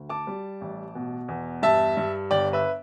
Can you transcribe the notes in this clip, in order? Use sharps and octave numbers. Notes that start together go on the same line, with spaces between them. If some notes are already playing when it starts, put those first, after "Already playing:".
Already playing: D2
A5 D6
G3
A1
B2
E2
G2 E5 A5
G2
G1 D5 G5
B4 E5